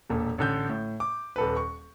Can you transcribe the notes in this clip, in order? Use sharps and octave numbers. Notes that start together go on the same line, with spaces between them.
E1 A#2 A4
A1 D3 G6
A2
D6
D#1 A4 B4
C#6